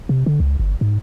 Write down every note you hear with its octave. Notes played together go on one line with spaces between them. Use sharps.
C3
D3
C#2
G1
G#2